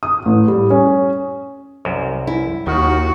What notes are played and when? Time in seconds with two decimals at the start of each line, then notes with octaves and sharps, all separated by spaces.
0.03 D#6
0.25 A1
0.48 G3
0.70 C#4
1.85 C2 F#2
2.27 E4
2.67 D#2 D#3 F#4